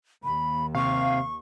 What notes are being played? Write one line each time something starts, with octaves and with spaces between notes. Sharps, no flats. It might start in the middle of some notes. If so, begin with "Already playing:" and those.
D#2 B5
C3 F5 C#6